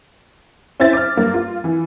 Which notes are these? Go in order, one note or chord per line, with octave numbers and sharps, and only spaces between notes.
C#4 E4 C5 E5 A6
D6 F6
G2 A#3
F4
E3